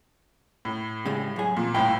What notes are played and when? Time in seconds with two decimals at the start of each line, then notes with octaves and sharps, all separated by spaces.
0.65 A2
1.05 C#3 G3 G#3
1.36 F#2 G#4
1.57 F2 A#2
1.75 G1 A2 F5 G5